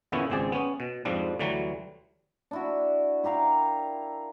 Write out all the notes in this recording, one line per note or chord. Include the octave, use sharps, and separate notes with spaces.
E2 A#2 D3 B3 C#4 E4
G#1 C#2 C4 G4 G#4 D5
B3 C#4
B2
F2 G#2 F3 G3 D4
D2 D3 E3 F#3 G3
D4 E4 F#4
E4 G4 A#4 F5